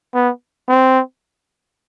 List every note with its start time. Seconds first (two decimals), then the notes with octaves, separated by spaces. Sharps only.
0.14 B3
0.68 C4